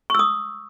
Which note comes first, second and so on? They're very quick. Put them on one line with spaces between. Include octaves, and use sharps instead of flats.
C#6 E6 D#6